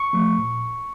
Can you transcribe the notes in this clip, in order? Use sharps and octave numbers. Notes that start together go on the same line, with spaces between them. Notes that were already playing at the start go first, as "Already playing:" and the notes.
Already playing: C#6
F3 A3
A#2